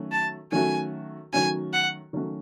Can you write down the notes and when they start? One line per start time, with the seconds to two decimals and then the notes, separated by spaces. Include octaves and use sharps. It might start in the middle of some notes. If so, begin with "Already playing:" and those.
Already playing: D#3 F#3 A3 C#4 F#4
0.12 A5
0.52 D#3 F#3 A3 C#4 F#4 G#5
1.33 D#3 F#3 A3 C#4 F#4 G#5
1.73 F#5
2.13 D#3 F#3 A3 C#4 F#4